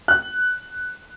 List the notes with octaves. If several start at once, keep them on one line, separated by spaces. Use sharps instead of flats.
F#6